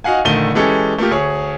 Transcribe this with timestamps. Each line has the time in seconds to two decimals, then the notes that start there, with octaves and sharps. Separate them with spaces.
0.04 D#4 F#4 F5 F#5 G#5
0.25 A#1 D3 D#3 A3 D#7 G7
0.55 E3 G#3 C#4 G4 A4
0.98 A3 A#3 F4 G4
1.11 D2 G#4 C#5